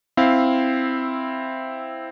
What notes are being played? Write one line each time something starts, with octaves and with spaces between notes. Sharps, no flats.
C4 E4 F5